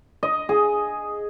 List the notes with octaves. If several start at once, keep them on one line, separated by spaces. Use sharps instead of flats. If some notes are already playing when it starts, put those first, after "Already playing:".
D#5
G#4